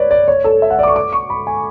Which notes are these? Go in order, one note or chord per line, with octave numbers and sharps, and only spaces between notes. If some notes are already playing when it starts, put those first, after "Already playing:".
Already playing: B4 C#5 D5
D5
C#5
A4
E5
F#5
D5
D6
C#6
D6
C#6
B5
G#5